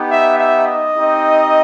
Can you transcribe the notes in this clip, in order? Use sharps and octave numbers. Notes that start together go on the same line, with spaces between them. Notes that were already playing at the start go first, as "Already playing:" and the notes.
Already playing: B3 D#4 G4
E5
E5
D#5
C4 D#4 G4